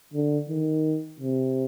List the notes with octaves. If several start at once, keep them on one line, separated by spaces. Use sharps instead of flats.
D3
D#3
C3